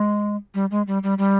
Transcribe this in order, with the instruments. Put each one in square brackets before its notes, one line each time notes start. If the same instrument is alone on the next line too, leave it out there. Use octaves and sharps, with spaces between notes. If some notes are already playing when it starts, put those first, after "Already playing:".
Already playing: [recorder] G#3
G3
G#3
G3
G3
G3